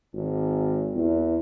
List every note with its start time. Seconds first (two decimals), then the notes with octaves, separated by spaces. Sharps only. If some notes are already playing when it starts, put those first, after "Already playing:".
0.14 G#1
0.95 E2